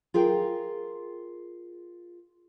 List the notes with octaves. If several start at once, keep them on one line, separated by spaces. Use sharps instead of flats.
F4 G#4 A#4 G5